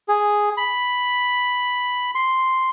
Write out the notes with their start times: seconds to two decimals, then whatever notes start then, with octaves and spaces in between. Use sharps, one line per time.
0.08 G#4
0.57 B5
2.15 C6